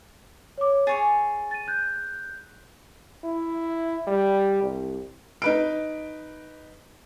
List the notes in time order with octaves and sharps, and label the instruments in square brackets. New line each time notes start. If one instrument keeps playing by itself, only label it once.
[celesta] C#5 D6
[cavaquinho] G#4 C#5 G#5 [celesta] A6
[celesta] A6 D#7
F#6 G6
[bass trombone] E4
G3
C2
[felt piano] D#4 B4 D7